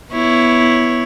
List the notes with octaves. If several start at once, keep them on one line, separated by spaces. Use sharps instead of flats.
B3 E4 C#5